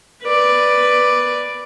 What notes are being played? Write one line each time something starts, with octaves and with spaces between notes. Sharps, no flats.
B4 D5